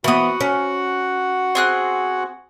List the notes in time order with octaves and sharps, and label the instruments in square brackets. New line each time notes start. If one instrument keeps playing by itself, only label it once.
[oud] E3 B3 [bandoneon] F#4 F#5 [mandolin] B5 D#6
[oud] C#4
[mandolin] C4 G#4 F#6